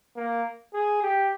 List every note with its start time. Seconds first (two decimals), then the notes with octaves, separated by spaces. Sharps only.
0.16 A#3
0.74 G#4
1.02 G4